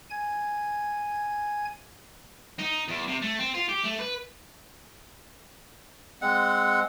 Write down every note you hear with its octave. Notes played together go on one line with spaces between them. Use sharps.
G#5 G#6
D#4
E2
C3
A3
C4
F4
G4
A3
B4
G#3 C4 F#5